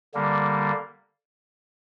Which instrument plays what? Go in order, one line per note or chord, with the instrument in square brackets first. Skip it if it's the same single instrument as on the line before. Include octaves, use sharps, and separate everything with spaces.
[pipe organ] D3 G3 A#3